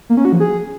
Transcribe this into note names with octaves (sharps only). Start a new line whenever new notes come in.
A#3
C#4
F#4
F3
G#4